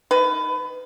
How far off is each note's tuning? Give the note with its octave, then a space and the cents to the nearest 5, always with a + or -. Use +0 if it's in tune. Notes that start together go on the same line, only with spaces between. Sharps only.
D#3 +0 B4 +25